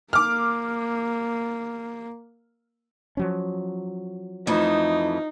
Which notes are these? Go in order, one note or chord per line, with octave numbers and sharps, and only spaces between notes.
A#3 D6 F6
F3 F#3 C#4
F2 E3 A3 D#4